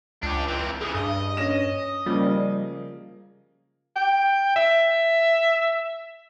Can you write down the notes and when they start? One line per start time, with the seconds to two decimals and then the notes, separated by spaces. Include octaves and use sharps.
0.23 C#2 D4 G4
0.48 E3 C4
0.81 C#3 E3 G#4
0.95 G2 D#5
1.37 C#4 A#6 E7
2.06 C#3 F3 G3 A#3
3.96 G5
4.56 E5